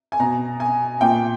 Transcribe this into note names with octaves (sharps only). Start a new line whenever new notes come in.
G#5
B2 A#5
G#5
A#2 G5